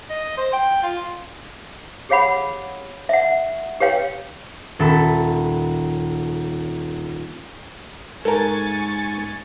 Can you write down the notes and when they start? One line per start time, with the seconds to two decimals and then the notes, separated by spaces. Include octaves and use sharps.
0.10 D#5
0.38 C5
0.53 G5
0.83 F4
2.09 G4 G#4 C#5 F5 F#5 B5
3.09 E5 F#5
3.80 G4 B4 C#5 F5 G5
4.79 D#1 A4 B5
8.25 G#2 A4 A#4 G#5 C#6 A6